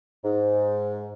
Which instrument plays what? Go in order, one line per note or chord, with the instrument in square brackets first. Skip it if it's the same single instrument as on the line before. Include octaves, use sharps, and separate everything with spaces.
[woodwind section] G#2